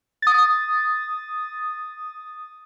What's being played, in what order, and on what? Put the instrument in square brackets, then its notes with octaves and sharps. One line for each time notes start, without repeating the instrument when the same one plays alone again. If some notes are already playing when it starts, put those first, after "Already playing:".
[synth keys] D#6 A6